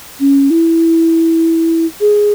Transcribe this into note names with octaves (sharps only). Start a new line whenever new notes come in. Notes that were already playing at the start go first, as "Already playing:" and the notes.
C#4
E4
G#4